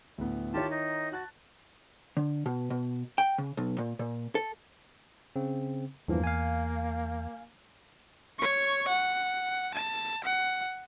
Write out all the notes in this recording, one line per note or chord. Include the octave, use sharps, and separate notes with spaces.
D2 A2 B3
D#3 E4 F4 G4 C#5 A5
D#4 D#5
F#4 A5 F#6 A6
D3
B2
B2
G5
C#3
B1
A#2
A#2
A4
C#3 C4
E2 G2 E3 F3 A#3
F5 G#5
C#5 C#6
F#5
A5
F#5